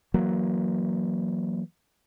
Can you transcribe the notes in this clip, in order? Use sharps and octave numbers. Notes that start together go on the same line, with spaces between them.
E3 F#3 A#3